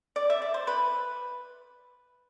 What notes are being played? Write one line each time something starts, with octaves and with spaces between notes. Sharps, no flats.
D5
E5
D5
C5
B4